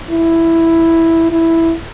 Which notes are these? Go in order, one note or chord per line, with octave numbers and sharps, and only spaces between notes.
E4
E4